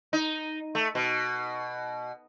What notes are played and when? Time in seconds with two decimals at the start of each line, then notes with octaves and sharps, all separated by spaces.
0.13 D#4
0.75 A3
0.95 B2